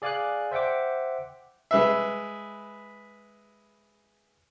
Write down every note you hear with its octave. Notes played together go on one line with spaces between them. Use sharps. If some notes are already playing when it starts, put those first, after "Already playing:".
G#4 D5 F5 G#5 D6 F#6
C5 E5 F#5 G5 D6
G#3 B4 E5